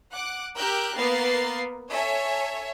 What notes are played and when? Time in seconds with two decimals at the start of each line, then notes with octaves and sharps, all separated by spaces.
0.13 F#5 D6 F#6
0.56 G4 A#4 E6 F#6 G6 D7
0.96 A#3 B3 A#4 A6 C7
1.92 A4 C#5 E5 G#5